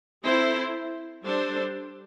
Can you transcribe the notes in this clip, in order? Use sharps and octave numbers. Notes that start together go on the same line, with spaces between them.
C4 E4 A4 C5
G3 D4 A4 C5